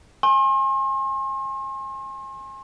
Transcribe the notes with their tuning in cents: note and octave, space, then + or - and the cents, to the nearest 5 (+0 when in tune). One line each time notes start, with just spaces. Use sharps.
G#5 +0 C6 +40